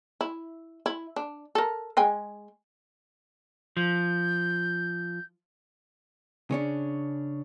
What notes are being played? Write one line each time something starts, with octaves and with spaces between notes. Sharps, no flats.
E4
E4
D4
A4 A#4
G#3 G5 G#5
F3 G6
C#3 C#4 D4